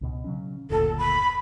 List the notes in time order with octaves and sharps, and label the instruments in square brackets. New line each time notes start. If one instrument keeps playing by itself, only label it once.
[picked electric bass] C#2 B2
C#3 F#3 C#4
[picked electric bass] F#1 D2 A#2 [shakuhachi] A4
[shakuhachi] B5